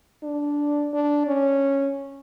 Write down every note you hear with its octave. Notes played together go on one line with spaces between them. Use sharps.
D4
D4
C#4